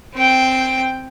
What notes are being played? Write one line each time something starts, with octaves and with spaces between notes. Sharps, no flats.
C4 G5